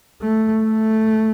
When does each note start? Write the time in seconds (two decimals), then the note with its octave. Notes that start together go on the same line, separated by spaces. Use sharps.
0.22 A3
0.63 A3